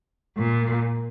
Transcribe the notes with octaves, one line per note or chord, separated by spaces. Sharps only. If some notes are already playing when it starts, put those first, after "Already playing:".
A#2